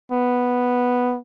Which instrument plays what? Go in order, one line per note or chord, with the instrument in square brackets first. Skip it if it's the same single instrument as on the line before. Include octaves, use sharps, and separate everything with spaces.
[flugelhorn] B3